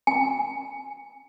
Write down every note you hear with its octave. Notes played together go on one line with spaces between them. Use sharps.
G#5